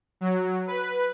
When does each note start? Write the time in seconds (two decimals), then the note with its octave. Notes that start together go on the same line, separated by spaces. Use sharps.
0.21 F#3
0.67 B4